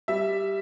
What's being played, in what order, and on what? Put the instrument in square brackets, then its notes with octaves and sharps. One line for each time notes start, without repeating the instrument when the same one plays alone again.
[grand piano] G3 E5